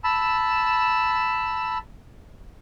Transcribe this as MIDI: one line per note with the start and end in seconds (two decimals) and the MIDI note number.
0.04 1.78 81
0.04 1.78 83
0.04 1.78 88